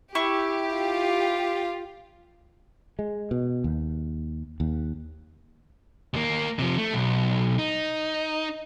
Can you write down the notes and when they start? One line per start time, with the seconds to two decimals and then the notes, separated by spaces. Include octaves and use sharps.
0.15 E4 G4 C#6
0.76 F4
2.99 G#3
3.31 B2
3.64 D#2
4.60 D#2
6.14 D#2 A#3
6.59 C3 F3
6.78 A3
6.93 B1
7.59 D#4